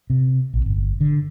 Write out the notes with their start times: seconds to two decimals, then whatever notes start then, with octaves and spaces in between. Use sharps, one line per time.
0.10 C3
0.54 A#1
0.66 G1
1.01 D3